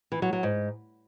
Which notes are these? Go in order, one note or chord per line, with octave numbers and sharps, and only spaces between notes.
E3
F#3
F#3
G#2